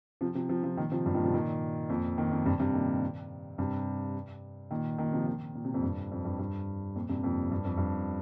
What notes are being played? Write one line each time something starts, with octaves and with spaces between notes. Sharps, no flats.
C3 F3
C3 F3
C3 F3
C3 F3
A#2 D#3
C3 F3
G2 C3
F3
A#2 D#3
C3 F3
A#2 D#3
F2 A#2
A#2 D#3
F2 A#2
G2 C3
G2 C3
A#2 D#3
G2 C3
A#2 D#3
A#2 D#3
C3 F3
A#2 D#3
A#2
C3
F2 A#2
G2
F2
G2
G2
F2 A#2
G2 C3
F2 A#2
G2
F2
G2